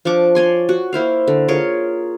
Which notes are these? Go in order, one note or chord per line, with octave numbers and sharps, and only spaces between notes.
F3 D4 C#6 D6
C#5 D5 G#5 C6
F#4
A#3 E4 C5 F5
D3
F4 G#4 A#4 C#5